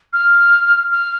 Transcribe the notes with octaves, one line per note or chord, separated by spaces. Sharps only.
F6
F6